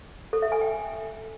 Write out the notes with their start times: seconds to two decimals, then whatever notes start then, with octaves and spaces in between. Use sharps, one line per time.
0.33 A4
0.42 E5
0.52 G#5
0.61 G5